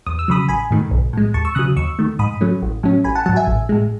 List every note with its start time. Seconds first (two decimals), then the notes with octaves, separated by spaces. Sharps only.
0.06 E2 D#6
0.19 E6
0.28 C#3 F#3 B5 D#6
0.48 A1 G#5 B5
0.71 G#2 D#3 A3
0.91 B1
1.13 A2 G#3
1.34 D#2 A5 C#6
1.45 C#6 E6
1.55 C#3 F#3 D#6 F#6
1.76 D#2 C#6 E6
1.99 D#3 A3
2.19 G#2 B5 D#6
2.41 F#3 A3 C#4
2.62 A1
2.83 A2 F#3 C#4
3.04 A1 G#5 B5
3.15 F#5 A5
3.26 G#2 F#3 F#5 A5
3.36 E5 G#5
3.47 A1
3.69 A2 G#3